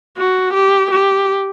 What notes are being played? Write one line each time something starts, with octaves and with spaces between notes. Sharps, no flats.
F#4
G4
G4